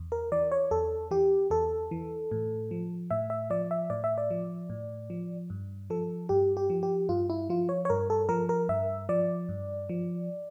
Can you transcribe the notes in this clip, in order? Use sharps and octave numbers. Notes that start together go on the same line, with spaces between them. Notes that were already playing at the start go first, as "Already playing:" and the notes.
Already playing: E2
A#4
E3 D5
C#5
E2 A4
E3 G4
E2 A4
E3
A2
F3
A2 E5
E5
F3 D5
E5
A2 D5
E5
D5
F3
A2
F3
G2
F3 A4
G2 G4
G4
F3
G4
G2 F4
E4
F3 F4
C#5
C#5
G2 A#4
A4
F3 A#4
A#4
G2 E5
F3 D5
G2
F3